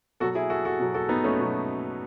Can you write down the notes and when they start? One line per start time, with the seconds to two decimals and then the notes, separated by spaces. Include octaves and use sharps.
0.20 B2 F#3 F#4 A4
0.35 E4 G#4
0.50 F#4 A4
0.65 F#4 A4
0.79 B2 F#3
0.94 F#4 A4
1.09 B3 D#4
1.24 A3 C#4
1.39 B2 F#3